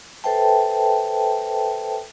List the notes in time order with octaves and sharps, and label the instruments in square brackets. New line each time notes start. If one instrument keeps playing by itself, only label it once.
[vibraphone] A4 B4 C5 E5 G5 A5